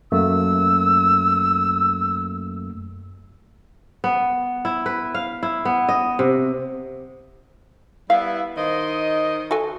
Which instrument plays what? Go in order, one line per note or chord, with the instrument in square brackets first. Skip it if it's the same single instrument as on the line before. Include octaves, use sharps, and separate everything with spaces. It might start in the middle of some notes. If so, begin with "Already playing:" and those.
[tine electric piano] F#2 A3 A#3 [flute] E6
[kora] B3
E4
B4
F5
E4
B3
D#5
C3
[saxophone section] G3 B3 E4 [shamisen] F5
[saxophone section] D#3 C5 D#5
[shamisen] F#4 A4 G#5